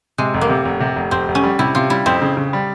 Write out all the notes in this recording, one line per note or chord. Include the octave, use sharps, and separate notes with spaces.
C3 G#3
F1
A#3
C3
F1
C3
F1
F1 C4
F1
C#4
G3
C3 E4
C3 F4
G3 E4
F2 C4
C#3
C#3
G3